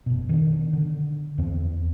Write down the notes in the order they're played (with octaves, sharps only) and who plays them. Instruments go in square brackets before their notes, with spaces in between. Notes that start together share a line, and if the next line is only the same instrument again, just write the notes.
[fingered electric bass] F1 B2
D#3 B3 D4
D3
E2 C4